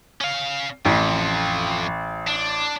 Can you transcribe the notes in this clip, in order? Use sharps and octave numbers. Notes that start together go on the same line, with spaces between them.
C#4 F5
A1 F2
D4